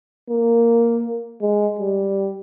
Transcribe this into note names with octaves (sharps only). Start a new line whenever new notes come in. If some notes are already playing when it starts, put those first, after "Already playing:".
A#3
G#3
G3